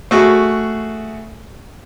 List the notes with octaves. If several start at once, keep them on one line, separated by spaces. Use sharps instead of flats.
A3 F#4 G#4